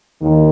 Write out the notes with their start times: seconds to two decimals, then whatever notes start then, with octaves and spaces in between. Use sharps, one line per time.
0.21 D#2 D#3